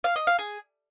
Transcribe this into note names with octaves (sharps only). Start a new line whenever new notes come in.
F5
D#5
F5
G#4